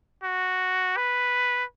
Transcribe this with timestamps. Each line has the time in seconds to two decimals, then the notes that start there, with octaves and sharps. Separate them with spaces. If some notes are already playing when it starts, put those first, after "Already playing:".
0.23 F#4
0.97 B4